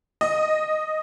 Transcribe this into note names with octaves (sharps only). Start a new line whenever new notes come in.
D#5